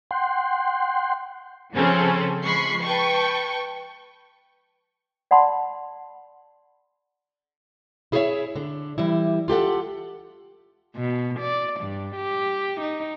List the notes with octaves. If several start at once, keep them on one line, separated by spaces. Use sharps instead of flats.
F#5 G5 C6
C#3 F3 C4 C#4 G#4 A4
F3 G#3 B5 C#6 C7
B4 G5 A5 C#6
D5 F#5 A5 B5 C6
E4 G#4 A4 B4 C#5 E5
D3
E3 G3 E4
F4 G4 A4 F#5
B2
D5
G2
G4
D#4